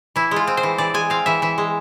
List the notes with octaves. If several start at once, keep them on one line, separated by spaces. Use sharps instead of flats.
E3 E4
G#3 F4
C4
C5
E3
E3 D5
G#3 G#5
C4 F5
E3 E5
E3 E5
G#3